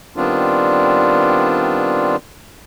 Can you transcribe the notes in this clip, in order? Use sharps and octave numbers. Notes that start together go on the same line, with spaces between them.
D#3 G3 B3 C4 D4 F4